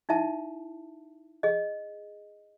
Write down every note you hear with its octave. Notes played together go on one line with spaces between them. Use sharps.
D#4 E4 E5 A5
G#4 D#5